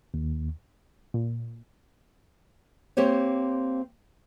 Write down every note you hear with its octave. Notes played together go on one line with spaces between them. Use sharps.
D#2
A#2
A#3 C4 G4 C5 C#5